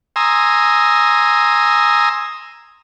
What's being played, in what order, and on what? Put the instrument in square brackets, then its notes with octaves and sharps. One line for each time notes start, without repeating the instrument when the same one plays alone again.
[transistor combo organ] G#5 A#5 C6 D#6 E6